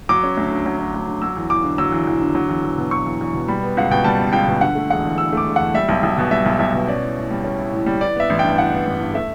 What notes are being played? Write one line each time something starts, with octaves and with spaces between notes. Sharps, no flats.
F#3 D6
C#4
D2
D3
F#3
C#4
D2
D3
F#3 E6
E2
E2 D6
D3
F#3 E6
E2
E2
D3
F#3
E2
E2
B2
F#3 C#6
E2
E2
B2
G3 B5
B3
C#2 F#5
B2 G5
G3 A5
B3
C#2 G5
B2
D3 F#5
A3
E1 F#5
E2
D3 E6
A3 D6
E1
E2 F#5
G3 E5
B1
B1
B2
G3 E5
B1
B1 E5
B2
C#4 D5
E4
A2
G3
C#4
E4
A2
G3
E3 D5
B3 E5
A1
G2 G5
E3 F#5
B3
A1
G2
A3 E5